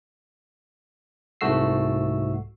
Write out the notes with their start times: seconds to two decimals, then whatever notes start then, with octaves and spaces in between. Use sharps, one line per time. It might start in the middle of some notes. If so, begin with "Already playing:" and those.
1.41 C2 G#2 A3 F#4 E6 C7